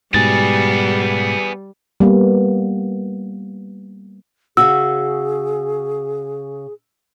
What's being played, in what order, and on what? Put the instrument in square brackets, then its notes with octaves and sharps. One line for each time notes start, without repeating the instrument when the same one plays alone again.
[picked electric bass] G#2 B2 [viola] G3 [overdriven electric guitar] B3 G#4 [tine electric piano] A6
[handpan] G3 A#3 B3
[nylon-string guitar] C#3 C#4 F#4 [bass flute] G#4 [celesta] E6